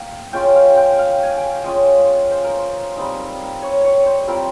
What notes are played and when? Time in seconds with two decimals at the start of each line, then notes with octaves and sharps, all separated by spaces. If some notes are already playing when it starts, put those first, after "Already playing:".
Already playing: A#3 F5 G5
0.33 G#3 C#4 F4 G5
0.56 F5
0.77 G5
0.99 F5
1.23 G#5
1.37 G5
1.51 F5
1.64 G#3 C#4 F4 D#5
2.31 C5
2.44 A#4
2.58 C5
2.97 G3 C4 D#4
3.62 C#5
3.85 C#5
4.06 C5
4.27 G3 C4 F4 A#4